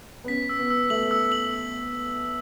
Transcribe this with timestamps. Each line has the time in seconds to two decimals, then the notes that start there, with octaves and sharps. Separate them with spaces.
0.24 B3
0.28 C#4 B6
0.49 E6
0.59 B3
0.70 E6
0.90 A3 F#7
1.11 E6
1.32 F#7